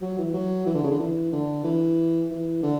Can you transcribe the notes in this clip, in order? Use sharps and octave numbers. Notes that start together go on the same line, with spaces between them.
F#3
E3
F#3
E3
D3
C#3
D3
E3
D3
E3
E3
D3